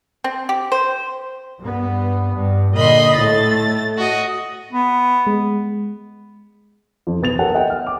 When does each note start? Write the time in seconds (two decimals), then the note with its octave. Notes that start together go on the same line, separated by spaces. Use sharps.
0.24 C4
0.49 G4
0.72 C5
1.60 G2 B3
2.35 G2
2.74 A#2 D3 D#5 B5 C6
3.16 A2 A3 A6
3.97 F#4 D#5
4.73 B3
5.27 G#3
7.07 F2
7.22 B1 B4 A6 F7
7.39 G4 A4 A#4 C#5 F#5 A5
7.54 D#5 E5 F#5 G5
7.70 F6
7.87 D6